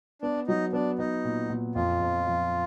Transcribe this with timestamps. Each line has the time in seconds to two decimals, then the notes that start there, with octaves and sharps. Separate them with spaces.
0.22 B3 D4
0.47 F#3 D#4
0.73 B3 D4
0.99 B3 D#4
1.25 A#2
1.50 A#2
1.75 F2 F4
2.01 F2
2.27 F3